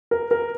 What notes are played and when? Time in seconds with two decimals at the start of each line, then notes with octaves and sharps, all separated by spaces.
0.11 A#4
0.31 A#4